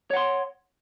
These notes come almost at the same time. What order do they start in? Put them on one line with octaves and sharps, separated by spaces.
C#5 F#5 C6